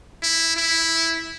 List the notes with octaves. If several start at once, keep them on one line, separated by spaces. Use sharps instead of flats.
E4
E4